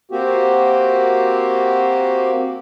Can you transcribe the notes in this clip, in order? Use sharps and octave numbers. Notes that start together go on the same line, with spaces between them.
A#3 C4 F#4 G4